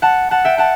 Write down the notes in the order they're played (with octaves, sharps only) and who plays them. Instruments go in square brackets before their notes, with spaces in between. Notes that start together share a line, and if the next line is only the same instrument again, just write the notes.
[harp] F#5 A5
F#5 A5
E5 G5
F#5 A5